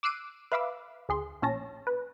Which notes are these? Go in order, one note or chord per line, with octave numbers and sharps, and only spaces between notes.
D6 E6 F#6 C7 D7 D#7
B4 E5 F5 B5 D6 E6
D2 G#4 C6
A#1 C#4 A5 A#6
B4